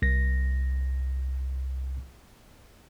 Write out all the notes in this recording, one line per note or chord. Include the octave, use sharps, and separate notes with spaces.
C2 A#6